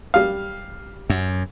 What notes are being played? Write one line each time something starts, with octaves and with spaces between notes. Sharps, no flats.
G3 F5
F#2